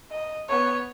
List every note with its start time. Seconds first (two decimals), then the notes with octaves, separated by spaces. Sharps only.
0.11 D#5
0.48 B3 C#5